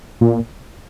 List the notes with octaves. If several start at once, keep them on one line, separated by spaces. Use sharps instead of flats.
A#2